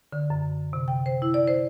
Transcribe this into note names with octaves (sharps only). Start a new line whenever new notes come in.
D3
F#2
C3
G5
C5
E4
D5
C5